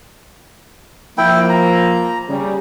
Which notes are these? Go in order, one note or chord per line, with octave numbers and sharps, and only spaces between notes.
F3 A#3 E4 G5
A#5
C#3 G3